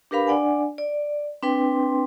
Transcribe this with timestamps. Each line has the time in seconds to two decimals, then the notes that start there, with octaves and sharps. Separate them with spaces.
0.11 D4 G4 A#4 B4 F5 B5
0.27 D4 D5 F#5 G#5
0.78 D5
1.43 C4 D4 B4 G5 C6